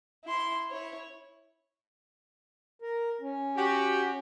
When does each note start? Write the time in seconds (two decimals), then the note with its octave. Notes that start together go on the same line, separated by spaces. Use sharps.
0.24 E4 C6
0.71 E4 C#5
2.82 A#4
3.21 C#4
3.57 F#4 G4